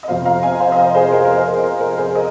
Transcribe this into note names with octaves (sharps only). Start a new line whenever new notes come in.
D#5
F2 C3 F3 C5 F5
F5 A#5
D#5 G#5
C5 F5
D#5
C5 F5
G#4 C5
A#4
A#4
G#4 C5
A#4
A#4
A#4
G#4 C5
A#4 D#5